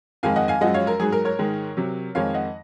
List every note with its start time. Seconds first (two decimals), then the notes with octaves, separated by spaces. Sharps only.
0.23 F2 D#3 G#3 F5 G#5
0.36 D#5 F#5
0.48 F5 G#5
0.61 F#2 F3 G#3 D#5 F#5
0.74 C#5 F5
0.87 A#4
0.99 G#2 F#3 G#4
1.12 A#4
1.25 A#4 C#5
1.39 G#2 D#3 G#3
1.77 C3 F#3
2.15 F2 D#3 G#3 C#5 F5
2.34 D#5 F#5